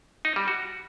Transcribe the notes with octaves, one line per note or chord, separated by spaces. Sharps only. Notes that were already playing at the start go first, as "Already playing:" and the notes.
D#4
G3
F#4